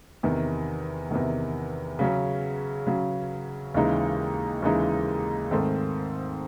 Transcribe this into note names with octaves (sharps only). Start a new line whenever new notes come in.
E2 C3 D#3
E2 C3 D#3
C#3 F#3 C#4
C#3 F#3 C#4
D#2 C#3 E3 G#3 D#4
D#2 C#3 E3 G#3 D#4
G#2 D#3 A3 C4